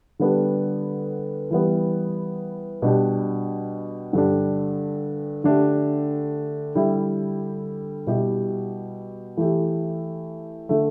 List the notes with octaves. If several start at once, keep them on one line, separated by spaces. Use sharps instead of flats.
D3 G3 B3 D4
E3 G3 B3
B2 G3 D4 G4
G2 D3 G3 D4
D3 A3 D4 G4
D3 G3 E4 G4
B2 G3 E4 G4
E3 A3 G4
D3 A3